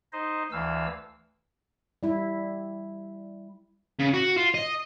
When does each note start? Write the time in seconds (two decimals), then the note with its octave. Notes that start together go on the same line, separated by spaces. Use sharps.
0.13 D#4 C5 D#5
0.52 D2 E3 F5 E6
2.03 G3 E4
4.00 C#3
4.14 F#4
4.37 F4
4.54 D#5